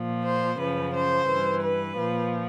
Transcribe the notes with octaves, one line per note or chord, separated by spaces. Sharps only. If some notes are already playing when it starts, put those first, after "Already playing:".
Already playing: A#2 F3
C5
F#2 C#3 F3 B4
C5
G2 E3
B4
A#2 F3